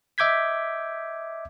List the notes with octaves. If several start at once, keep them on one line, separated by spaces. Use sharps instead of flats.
D#5 E5 D6 G6 G#6 B6